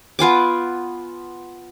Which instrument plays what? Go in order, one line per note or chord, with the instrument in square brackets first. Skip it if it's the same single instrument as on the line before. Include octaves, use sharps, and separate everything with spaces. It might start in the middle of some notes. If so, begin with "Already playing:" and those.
[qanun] B3 F4 G#5 D6